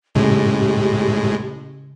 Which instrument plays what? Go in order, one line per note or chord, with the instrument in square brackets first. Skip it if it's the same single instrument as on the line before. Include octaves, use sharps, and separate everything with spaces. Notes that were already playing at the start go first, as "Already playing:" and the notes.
[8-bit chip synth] A2 G#3 [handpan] C#3 [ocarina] G4